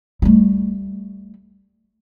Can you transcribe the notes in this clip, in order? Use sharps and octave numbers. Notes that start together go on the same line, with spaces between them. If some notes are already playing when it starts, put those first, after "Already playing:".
G3 A3